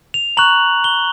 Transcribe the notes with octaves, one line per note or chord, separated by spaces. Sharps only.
F7
A#5 C#6 F#6 F#7
G7